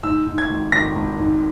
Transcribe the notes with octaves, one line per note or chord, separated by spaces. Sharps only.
G#2 E6
G#2
G#6
G#1
G#1 A#6
G#1
G#2